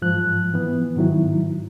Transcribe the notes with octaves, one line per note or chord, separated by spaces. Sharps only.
G#2 F3 F#6
E3 B3
G#2 D#3 F#3 E4